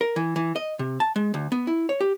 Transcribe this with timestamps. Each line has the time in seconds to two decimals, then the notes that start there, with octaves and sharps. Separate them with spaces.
0.01 A#4
0.16 E3
0.36 E3
0.56 D#5
0.79 C3
1.00 A5
1.16 G#3
1.34 D2
1.52 B3
1.67 E4
1.89 C#5
2.01 G4